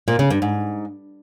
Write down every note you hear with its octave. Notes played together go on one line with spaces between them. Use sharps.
A#2
C#3
G2
G#2